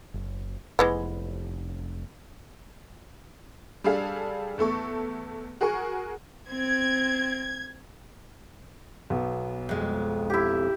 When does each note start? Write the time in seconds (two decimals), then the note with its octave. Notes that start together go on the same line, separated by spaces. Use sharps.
0.14 F#1
0.79 F1 E3 G#3 B3
3.84 G3 D4 G#4 A4 F5
4.58 E2 A3 A4 C#6
5.61 F#4 G#4 A#4 G#5 C#6
6.50 C4 G#6
9.10 B1 B3
9.69 F2 G#3
10.30 E4 G4